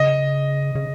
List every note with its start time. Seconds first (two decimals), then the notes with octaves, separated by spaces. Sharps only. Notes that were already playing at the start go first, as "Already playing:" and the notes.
Already playing: C#3 D#5
0.75 C#3